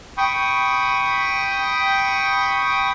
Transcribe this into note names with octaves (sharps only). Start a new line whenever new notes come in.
G5 B5 C#6 D#6